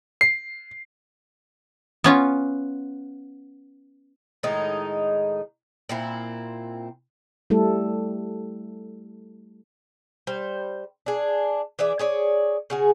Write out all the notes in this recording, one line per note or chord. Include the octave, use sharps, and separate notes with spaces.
C7
B3 C#4 F4
A2 D#3 G#3 D#4
A#2 C4 E4
G3 A3 E4 A4
G3 C5
D4 G#4
E3 G#4 D5 E5
G#4 C#5 D5
C#3 F#4 G#4